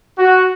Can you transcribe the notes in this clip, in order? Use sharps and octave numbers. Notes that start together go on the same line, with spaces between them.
F#4